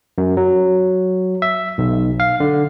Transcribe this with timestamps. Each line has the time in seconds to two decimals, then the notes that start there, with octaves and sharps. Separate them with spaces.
0.18 F#2
0.37 F#3
1.42 E5
1.78 B1
2.20 F5
2.40 D3